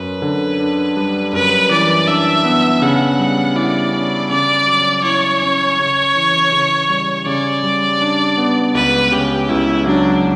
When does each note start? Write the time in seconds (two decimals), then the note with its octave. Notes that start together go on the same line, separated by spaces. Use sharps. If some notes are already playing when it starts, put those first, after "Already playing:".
Already playing: F#2 B4
0.22 D3
0.60 D4
0.97 G3
1.33 F#2 B4
1.71 E3 D5
2.07 D4 E5
2.45 B3
2.82 C#3 F#5
3.19 G3
3.55 E4 D5
3.93 C#4
4.30 C#3 D5
4.67 F#3
5.04 E4 C#5
5.42 C#4
5.79 C#3
6.16 E3
6.52 C#3
6.89 G3
7.26 C#3 D5
7.63 G3
8.01 D4
8.38 B3
8.75 C#2 B4
9.12 C#3 G4
9.49 C#2 E4
9.86 F#3 D4